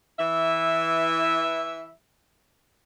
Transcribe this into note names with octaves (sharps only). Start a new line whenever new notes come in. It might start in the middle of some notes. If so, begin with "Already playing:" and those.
E3 E5